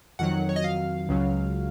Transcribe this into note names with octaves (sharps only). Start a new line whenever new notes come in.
F2 D#3 F#3 F#5
C#5
D#5
F5
C#2 C#3 F#3